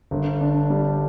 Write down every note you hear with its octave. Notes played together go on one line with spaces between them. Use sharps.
G1
D4
G3